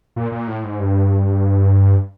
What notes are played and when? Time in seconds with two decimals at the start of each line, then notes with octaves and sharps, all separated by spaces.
0.16 A#2
0.32 A#2
0.48 A2
0.64 G#2
0.80 G2